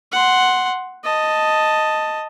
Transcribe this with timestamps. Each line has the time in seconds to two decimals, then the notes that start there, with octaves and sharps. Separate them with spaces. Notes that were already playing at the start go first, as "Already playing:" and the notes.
0.12 F#5 C6
1.04 D#5 A5